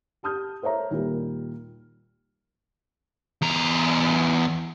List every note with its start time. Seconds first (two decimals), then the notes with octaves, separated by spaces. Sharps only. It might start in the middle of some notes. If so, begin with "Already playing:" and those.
0.23 G4 A5 D#6 F6 G6
0.62 A4 C5 C#5 E5 A#5
0.91 D#2 A#2 G3 A#4
3.42 E2 A#5